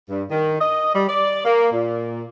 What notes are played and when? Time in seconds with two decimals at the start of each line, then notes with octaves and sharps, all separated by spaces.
0.10 G2
0.30 D#3
0.60 D#5
0.94 G3
1.08 D5
1.45 A#3
1.71 A#2